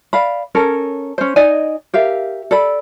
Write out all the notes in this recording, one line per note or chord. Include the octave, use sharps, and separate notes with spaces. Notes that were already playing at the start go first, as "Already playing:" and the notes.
D5 F5 B5
C#4 A4 A#4
C#4 C5
D#4 D5 D#5 G#5
G4 A#4 E5 F5
A4 D5 B5